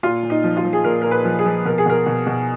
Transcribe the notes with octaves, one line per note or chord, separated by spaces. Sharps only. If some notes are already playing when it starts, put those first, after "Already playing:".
A#2 F4
A#2
D#4
F3
F4
F3
G#4
A#2 A#4
A#2 A#4
B4
F3
G#4
F3
B2 A#4
G#4
B2 A#4
B2
B2